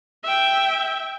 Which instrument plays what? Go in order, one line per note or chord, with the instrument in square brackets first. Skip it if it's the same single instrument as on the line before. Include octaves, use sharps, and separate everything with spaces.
[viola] E5 G5